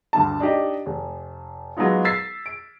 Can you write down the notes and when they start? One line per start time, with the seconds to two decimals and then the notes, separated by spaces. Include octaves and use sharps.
0.13 D2 G2 D3 A5
0.40 D4 D#4 G4 D#5
0.86 F1
1.77 F#3 G#3 B3 D#4 F4
2.05 E6 G#6 A6 B6 C7
2.46 D7